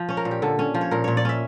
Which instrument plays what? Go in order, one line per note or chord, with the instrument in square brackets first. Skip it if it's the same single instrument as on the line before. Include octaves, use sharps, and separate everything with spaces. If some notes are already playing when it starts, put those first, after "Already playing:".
Already playing: [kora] F3
C#4 C#5
A#4
A#2
G4
D3 A4
C#4
F3
C#5
A#2 A#4
A#2 C#5
D5
C#4 E5